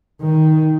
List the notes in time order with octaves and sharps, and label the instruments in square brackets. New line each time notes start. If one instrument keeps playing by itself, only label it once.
[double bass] D#3